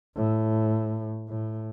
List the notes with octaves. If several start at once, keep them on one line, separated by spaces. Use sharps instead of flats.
A2
A2